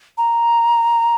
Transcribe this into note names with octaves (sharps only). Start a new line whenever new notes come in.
A#5